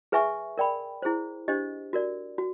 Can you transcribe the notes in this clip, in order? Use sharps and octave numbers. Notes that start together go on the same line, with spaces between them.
G#4 B4 E5 G#5 C#6
A#4 D5 G5 B5
E4 G#4 C5
D4 G4 C5 D#5
F#4 A#4 D5
F#4